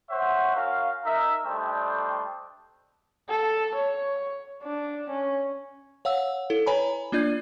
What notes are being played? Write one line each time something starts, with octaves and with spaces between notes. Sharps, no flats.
C5 C#5 E5 F#5
C#4 F#4 A#4 F5
D#4 A#4 E5
G3 A3 D4 C5 D#5 G5
A4
C#5
D4
C#4
C#5 F5 F#5 E6
E4 A4
B4 C#5 G#5 A#5 B5
A#3 D4 F4 D5 G6 G#6